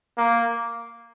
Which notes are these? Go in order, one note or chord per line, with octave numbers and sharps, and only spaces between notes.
A#3